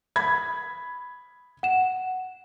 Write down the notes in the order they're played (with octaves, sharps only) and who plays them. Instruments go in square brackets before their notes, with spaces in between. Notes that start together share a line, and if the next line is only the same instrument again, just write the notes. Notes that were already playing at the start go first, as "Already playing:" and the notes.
[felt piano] B5 G#6
[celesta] F#5 E7